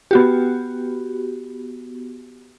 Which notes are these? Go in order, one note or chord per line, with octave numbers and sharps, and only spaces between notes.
B3 F#4 G4